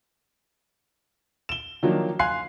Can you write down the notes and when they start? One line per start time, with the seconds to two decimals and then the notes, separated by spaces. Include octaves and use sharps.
1.49 E7 G7
1.83 D#3 F3 F#3 A#3 D4
2.19 F5 G#5 C6 F#6 C7